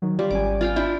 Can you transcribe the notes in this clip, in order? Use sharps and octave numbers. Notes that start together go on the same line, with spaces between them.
D#3 F#3
G3 F4 D5
G#1 C#4 G#5 D6
F4 F5 G5
D4 E4 G5